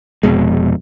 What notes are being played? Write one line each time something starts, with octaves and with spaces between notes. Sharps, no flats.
F1 F2 B2 G#3